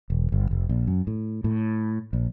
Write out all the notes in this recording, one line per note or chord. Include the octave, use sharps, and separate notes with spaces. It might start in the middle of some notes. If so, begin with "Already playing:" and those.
E1
G1
F1
A#1
F#2
A2
A2
A#1